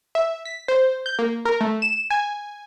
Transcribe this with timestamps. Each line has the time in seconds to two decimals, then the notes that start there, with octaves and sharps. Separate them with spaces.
0.15 E5
0.45 B6
0.68 C5
1.06 G6
1.19 A#3
1.45 A#4
1.61 A3
1.82 E7
2.10 G#5